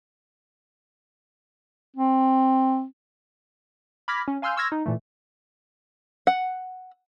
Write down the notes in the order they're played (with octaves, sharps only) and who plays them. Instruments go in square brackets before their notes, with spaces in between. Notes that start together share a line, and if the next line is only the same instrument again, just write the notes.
[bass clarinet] C4
[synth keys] B5 D6 F6 G#6 A#6 B6
C#4
F5 G#5 C6 E6 F6 G6
C6 C#6 E6 F6 G#6 A#6
D#4
A#2 E3 A3
[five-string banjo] F#5